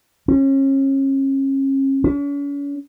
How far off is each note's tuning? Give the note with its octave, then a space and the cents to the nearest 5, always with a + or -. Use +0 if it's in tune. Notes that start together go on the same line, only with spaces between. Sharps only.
C#4 -35
C#4 +40